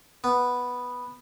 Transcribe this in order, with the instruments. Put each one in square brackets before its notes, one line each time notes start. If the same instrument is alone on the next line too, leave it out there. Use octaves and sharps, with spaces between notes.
[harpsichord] B3